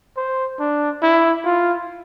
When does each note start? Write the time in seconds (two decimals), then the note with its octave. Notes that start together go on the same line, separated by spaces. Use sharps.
0.17 C5
0.60 D4
1.02 E4
1.45 F4